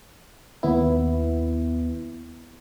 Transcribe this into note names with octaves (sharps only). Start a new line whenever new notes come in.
D#2 B3 E4